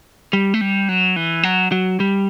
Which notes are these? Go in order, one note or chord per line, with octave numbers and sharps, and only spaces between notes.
G3
A3
G3
F#3
E3
F#3
F#3
G3